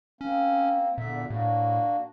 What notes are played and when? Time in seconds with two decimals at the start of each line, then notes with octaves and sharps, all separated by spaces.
0.21 A#3 C4 C#4
0.98 E2 A#2 D3 E5
1.30 A2 A#3 D4 F#4